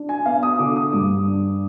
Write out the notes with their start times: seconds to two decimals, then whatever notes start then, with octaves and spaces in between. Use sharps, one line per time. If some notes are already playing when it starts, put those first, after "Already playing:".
Already playing: D4
0.09 G#5
0.26 B3 F5
0.43 D#6
0.59 D3 D6
0.76 D#6
0.93 G2 D6
1.26 D4